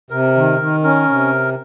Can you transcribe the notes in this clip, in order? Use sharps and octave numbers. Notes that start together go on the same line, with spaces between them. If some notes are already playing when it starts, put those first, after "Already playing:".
C3 A#4
D#3
D#3
C#4 A#4
C3